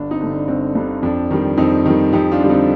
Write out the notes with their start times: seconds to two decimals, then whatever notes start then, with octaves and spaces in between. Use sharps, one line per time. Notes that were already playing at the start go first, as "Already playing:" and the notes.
Already playing: G1 D4
0.11 C4 D#4
0.21 G2 D3
0.30 D4
0.48 G1 C4
0.75 G2 D3
1.03 F2 D4
1.31 D#3 G3
1.57 F2 C4 D#4
1.86 D#3 G3
2.13 F2 D#4 G4
2.32 D4 F4
2.41 D3 G3
2.50 C4 D#4